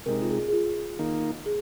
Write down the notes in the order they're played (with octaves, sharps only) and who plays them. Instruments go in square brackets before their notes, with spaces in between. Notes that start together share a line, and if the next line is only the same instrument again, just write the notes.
[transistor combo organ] C3 G#3 D#4 [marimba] A#4
[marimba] F4
G#4
G#4
F4
[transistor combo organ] D#3 A#3 D#4
[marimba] G#4